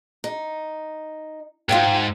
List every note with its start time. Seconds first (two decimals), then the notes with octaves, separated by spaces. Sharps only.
0.24 D#4
1.69 G#2 F4 F5 G5